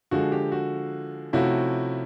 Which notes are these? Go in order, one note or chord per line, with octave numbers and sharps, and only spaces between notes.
D3 F3 G#3 F#4
G4
F#4
C3 F3 A3 C#4 E4 F#4